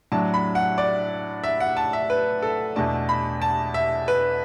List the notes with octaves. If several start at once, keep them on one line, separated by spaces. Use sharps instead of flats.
A2 F#3 D4 A5
B5
F#5
D5
E5
F#5
A5
E5
B4
A4
E2 B2 A3 D4 A5
B5
A5
E5
B4